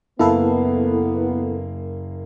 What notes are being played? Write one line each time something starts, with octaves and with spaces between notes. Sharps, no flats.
F#1 A#3 B3 E4 A4 B4 F5